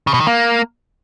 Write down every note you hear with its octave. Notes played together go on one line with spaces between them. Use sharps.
C#3
B2
D#3
A#3